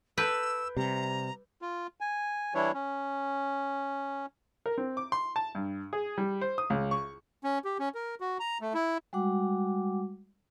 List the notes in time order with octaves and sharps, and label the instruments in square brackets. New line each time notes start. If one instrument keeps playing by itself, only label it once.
[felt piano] A4 G6 D7 [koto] B4 [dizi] E6
[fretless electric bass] C3 [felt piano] G3 [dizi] A#5
[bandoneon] F4
G#5
E3 G3 D4 E4 C#5
C#4
[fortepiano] A#4
C4
D6
C6
A5
G2
G#4
G3
C5
D#6
C#2
C#6
[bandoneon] C#4
G4
C#4
A#4
F#4
A#5
A3
E4
[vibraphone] G3 G#3 F#4 F#5 D6